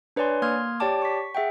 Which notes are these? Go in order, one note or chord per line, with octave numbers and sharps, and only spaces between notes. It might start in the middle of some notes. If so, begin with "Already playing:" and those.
D4 B4 C#5 D5 G#5 C6
A#3 C6 D#6 F6 G#6
G4 C#5 D5 G5 A5 D6
C#6 B6
G#4 E5 F#5 G5